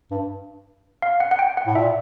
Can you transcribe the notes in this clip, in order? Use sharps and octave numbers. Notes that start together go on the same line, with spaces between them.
G2
F5
F#5
F#5
G5
F#5
A2
A#2 E5